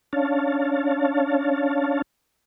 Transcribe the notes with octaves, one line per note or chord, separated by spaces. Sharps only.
C#4 D4 C#5 F5 A5